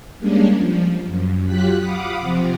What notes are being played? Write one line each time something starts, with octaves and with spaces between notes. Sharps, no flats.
G3 G#3 A#3 C#4 D4
F3
F#2
F#3 F4 G4 F#6 B6
F5 F#5 B5 D6 D#6
C3 F3 C4